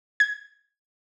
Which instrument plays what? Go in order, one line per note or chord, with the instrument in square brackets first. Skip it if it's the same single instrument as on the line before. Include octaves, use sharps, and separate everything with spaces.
[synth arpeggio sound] G#6